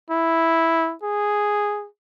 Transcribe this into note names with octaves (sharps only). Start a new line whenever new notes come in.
E4
G#4